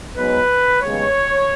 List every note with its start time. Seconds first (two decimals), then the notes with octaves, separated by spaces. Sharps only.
0.16 G#2 F#3 B3 B4
0.82 D#2 C#3 G#3 B3 C#5